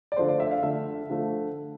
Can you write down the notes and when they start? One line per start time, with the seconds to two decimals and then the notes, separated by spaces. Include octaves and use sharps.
0.12 D5
0.16 D3 F3 A3 C5
0.28 D5
0.40 E5
0.51 F5
0.62 D3 F3 A3 E5
1.10 D3 F3 A3